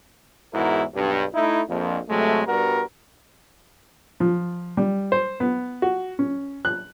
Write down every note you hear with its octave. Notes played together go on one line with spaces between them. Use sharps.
E2 G#2 E4 F#4 A#4
B1 G2
A3 D#4 E4
A#1 F2
C3 F#3 G#3 A3
G2 G3 B3 F#4 A#4
F3
G3
C5
B3
F#4
C#4
F#6